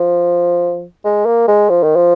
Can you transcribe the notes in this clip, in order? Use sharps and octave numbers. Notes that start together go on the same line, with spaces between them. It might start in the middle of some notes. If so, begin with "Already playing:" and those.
Already playing: F3
G#3
A#3
G#3
F3
D#3
F3